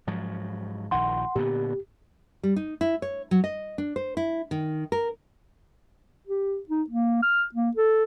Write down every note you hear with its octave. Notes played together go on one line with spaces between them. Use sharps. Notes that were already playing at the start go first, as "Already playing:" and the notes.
G#2 F3 F#3
A#1 D#3 F#5 C6
A#2 D3 B3 G4
G3
D#4
E4
C#5
F#3
D#5
D4
C5
E4
D#3
A#4
G4
D#4
A#3
F6
A#3
A4